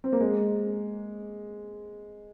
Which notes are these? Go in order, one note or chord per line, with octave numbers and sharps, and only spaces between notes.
C4
A#3
G#3